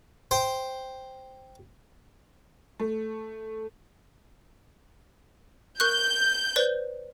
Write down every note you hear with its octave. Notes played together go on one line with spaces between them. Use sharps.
C5 G5
A3
A#4 C#6 F#6 G6
B4 C5 D5